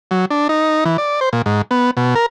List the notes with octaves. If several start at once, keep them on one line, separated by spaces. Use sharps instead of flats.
F#3
D4
D#4
E3
D5
C5
A#2
G#2
B3
B2
A#4